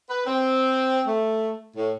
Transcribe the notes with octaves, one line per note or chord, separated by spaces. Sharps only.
B4
C4
A3
A2